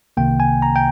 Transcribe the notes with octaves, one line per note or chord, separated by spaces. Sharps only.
C2 C3 D#3 A#3 G5
G#5
A#5
G5